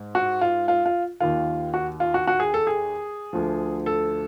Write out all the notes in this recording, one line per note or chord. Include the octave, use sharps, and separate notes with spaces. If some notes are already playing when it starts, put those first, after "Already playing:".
Already playing: G#2
F#4
F4
F4
F4
D#2 D#3 F4
F#4
F4
F#4
F#4
G#4
A4
G#4
D2 D3 F3
A4